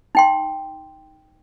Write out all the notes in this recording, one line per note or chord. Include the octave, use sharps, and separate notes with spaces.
D#4 G5 C6